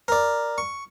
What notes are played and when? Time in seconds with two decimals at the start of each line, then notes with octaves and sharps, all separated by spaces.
0.08 A#4 D5
0.58 C#6